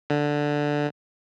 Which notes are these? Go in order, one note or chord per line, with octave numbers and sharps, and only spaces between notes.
D3